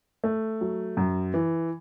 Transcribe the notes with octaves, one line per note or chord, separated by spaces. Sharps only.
A3
F#3
F#2
E3